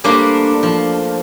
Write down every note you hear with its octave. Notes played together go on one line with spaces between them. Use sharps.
G3 A3 A#3 D4 C5
F3